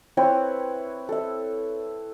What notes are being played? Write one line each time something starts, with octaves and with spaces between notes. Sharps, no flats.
C4 E4 B4 C#5
A4 E5